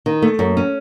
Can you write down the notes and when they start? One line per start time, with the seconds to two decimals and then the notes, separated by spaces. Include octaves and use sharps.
0.06 D#3
0.22 A3
0.39 F#2
0.57 C#4